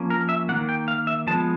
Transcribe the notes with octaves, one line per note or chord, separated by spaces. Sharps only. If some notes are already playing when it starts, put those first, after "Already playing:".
Already playing: F3 A#3 C#4
A#4
E5
D#3 G3 A#3 F#5
G5
F5
E5
F3 G#3 B3 A5